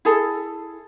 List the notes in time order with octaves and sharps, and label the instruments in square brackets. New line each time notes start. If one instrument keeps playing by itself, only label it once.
[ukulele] E4 G#4 A4